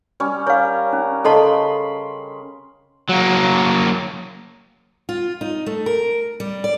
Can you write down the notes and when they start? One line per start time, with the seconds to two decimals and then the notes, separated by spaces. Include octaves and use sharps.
0.20 G3 C#4
0.47 A#4 C#5 F5
0.93 C#4
1.24 C#3 A4 D#5 A5 B5 C6
3.10 F#3 A#3
5.09 F4
5.41 D#4
5.66 A3
5.86 A#4
6.40 G3
6.64 D5